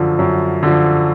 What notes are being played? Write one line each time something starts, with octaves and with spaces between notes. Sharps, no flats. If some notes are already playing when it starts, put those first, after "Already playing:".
Already playing: F#2 D3 F3
F#2
D3 F3